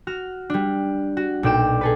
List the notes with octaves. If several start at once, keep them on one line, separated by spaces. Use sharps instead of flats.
F#4 F6
G3 D4
F#4
B1 A#2 D5 G5 D6 E7
G#4 A4 B4